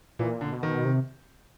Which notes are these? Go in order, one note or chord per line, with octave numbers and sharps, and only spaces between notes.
A#2 E3
D3
B2
D#3
C3